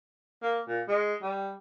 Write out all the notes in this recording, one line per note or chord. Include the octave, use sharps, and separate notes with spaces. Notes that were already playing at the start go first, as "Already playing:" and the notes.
A#3
A#2
G#3
G3